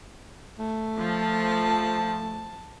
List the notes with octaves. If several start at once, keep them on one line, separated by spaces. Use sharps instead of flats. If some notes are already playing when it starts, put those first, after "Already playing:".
A3
F3 A5